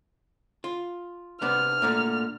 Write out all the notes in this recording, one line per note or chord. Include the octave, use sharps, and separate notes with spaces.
F4
C3 B3 D4 F6
A#2 D3 A3